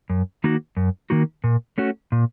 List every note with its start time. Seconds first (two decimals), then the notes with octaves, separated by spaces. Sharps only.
0.10 F#2
0.44 D#3 A#3 D#4 F#4
0.77 F#2
1.10 D#3 A#3 D#4 F#4
1.44 A#2
1.78 A3 C#4 F#4
2.12 A#2